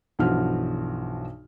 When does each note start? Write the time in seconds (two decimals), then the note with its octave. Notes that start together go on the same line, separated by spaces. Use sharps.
0.19 B1 G2 E3 F3 F#4 F6